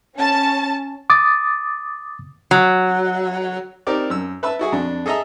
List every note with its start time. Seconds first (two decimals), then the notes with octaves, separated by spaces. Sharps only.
0.17 C#4 A5
1.10 D6 D#6 A6
2.51 F#3
3.87 C4 D#4 G4 A#4 D5
4.10 F#2 E6
4.43 B4 E5 A5 B5 E6
4.59 E4 F#4 G#4
4.72 F2 D4
5.06 G#4 A4 D#5 E5 A#5